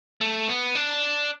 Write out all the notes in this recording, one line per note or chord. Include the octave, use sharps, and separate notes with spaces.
A3
B3
D4